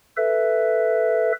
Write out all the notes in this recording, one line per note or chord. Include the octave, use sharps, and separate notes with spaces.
A4 B4 E5